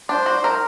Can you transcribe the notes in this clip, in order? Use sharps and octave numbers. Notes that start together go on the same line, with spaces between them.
D4 C5
F#4
A#4